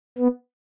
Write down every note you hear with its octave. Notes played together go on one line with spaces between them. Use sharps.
B3